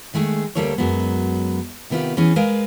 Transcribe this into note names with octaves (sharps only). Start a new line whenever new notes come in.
D#3 G#3 A3 G#4
D2 C3 G3 A#3 A4 C#5
F#2 F#3 G#3 B3
C3 D#3 B3 C#4 F4 G4
E3 B3 C#4 G#4
G#3 A#4 B4 F5